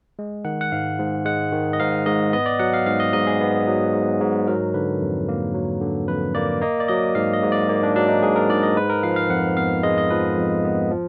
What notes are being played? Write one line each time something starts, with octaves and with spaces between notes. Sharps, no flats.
G#3
D#3 F#5
F#5
G#2 F5
G#2
G#3 F#5
D#3
D#5
G#2 F5
G#2 D#5
B3 D#5
D5
F#3 F#5
F5
G#2 F5
D#5
G#2 D#5
G#4
B3
F#3
G#2
G#2
F#3 A#4
D3 B4
F2
A#3
F#3
D3
F2 B4
A#3 D5
A#3 D#5
D5
F#3 D#5
G#2 F5
D#5
G#2
D5
A#3
D4
F#3 D4
D#4
G#2 G#4
A#4
G#2 D5
D#5
G#3 B4
A#4
F3 F5
F5
F2 F#5
B3 F5
G#3 D#5
D#5
F3 B4
F2
B3
F3